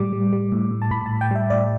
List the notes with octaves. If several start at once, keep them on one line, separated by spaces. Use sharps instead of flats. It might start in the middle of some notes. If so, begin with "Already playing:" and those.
Already playing: A2 G3 D6
G3
G3
A2
A2
A5
A2 B5
B5
A5
A2
G5
G3 E5
A2 D5